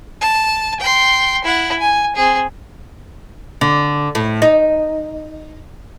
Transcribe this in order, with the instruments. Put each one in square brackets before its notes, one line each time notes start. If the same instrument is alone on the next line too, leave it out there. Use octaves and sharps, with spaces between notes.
[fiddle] A5
G5 C6
E4 F#5
G#5
C4 G#4
[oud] D3
A2
D#4